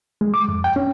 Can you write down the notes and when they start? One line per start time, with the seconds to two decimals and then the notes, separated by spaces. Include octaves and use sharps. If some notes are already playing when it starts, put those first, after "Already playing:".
0.21 G#3
0.34 D6
0.48 F2
0.64 G5
0.76 C#4